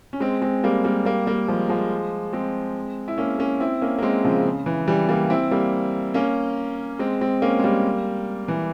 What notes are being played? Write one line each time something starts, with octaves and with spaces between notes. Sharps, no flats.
C#4
G#3 C4
G#3 C4
G3 A#3
G3 A#3
G3 A#3
G3 A#3
F3 G#3
F3 G#3
G#3 C4
E4
A#3 C#4
A#3 C#4
C4 E4
A#3 C#4
A#3
G#3 C4
C#3 F3
C#3
E3
E3 G3
G3 A#3
C4 E4
G3 A#3
A#3 C#4
G#3 C4
G#3 C4
A#3 C#4
G#3
G3 A#3
E3